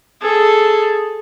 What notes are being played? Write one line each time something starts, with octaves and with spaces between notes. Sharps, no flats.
G#4 A4